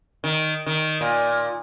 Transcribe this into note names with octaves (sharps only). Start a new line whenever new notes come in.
D#3
D#3
A#2